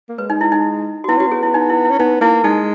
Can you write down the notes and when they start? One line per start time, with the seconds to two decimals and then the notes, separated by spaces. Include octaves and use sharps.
0.09 A#3
0.18 G#3 B4
0.30 D#4
0.41 E4
0.52 D#4
1.04 F#4
1.08 B3 E4
1.18 C#4 F#4
1.27 B3 G#4
1.43 E4
1.54 D#4
1.69 E4
1.85 E4
1.91 C#4
1.99 B3 D#4
2.21 A#3 E4
2.44 G#3 D#4